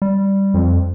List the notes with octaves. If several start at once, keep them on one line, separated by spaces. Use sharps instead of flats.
G3
F2